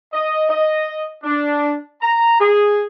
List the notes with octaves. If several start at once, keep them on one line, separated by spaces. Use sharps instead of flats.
D#5
D#5
D4
A#5
G#4